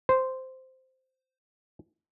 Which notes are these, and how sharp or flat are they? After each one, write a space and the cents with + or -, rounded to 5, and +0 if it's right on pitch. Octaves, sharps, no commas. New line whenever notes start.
C5 -10